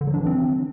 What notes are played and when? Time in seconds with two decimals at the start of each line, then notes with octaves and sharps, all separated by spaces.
0.01 D3
0.07 F#3
0.14 D4
0.20 E3
0.27 C4